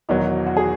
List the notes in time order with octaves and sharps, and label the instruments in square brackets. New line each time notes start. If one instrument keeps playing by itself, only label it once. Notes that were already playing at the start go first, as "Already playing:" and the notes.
[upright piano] E1 E2 D#3 F#3 D#4
F#4
G#4